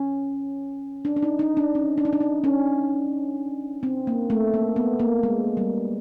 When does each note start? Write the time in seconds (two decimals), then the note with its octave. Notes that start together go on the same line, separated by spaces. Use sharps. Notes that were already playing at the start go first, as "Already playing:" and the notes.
Already playing: C#4
1.05 D4
1.17 D4
1.23 D#4
1.39 D#4
1.57 D4
1.75 C#4
1.98 D4
2.05 D#4
2.13 D4
2.21 D#4
2.44 C#4
3.83 C4
4.07 A#3
4.30 A3
4.54 A#3
4.76 B3
5.00 A#3
5.23 G#3
5.57 G3